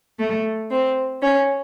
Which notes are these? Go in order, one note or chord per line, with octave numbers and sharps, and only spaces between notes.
A3
C4
C#4